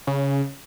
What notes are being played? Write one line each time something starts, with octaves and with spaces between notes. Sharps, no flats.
C#3